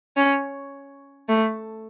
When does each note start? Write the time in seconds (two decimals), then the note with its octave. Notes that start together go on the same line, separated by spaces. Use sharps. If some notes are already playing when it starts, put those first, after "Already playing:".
0.17 C#4
1.29 A3